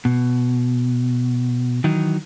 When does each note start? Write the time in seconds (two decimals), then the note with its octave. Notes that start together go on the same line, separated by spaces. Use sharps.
0.05 B2
1.84 D#3 E3 F#3 D#4